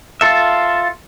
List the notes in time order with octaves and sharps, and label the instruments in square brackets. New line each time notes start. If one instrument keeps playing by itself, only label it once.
[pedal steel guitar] F4 A4 E5